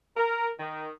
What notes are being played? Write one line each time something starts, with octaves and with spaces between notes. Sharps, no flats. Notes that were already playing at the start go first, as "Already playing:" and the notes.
A#4
D#3